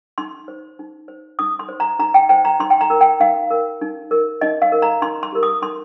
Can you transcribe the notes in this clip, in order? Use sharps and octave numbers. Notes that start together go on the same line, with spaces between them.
D#4 C6
C5
D#4
C5
D#4 D#6
C6
C5
A#5
D#4 A#5
G5
C5 G5
A#5
D#4 C6
G5
A#5
A#4
G5
D#4 F5
A#4
D#4
A#4
D#4 D#5
F5
A#4
A#5
D#4 C6
C6
G4 A#4
D#6
D#4 C6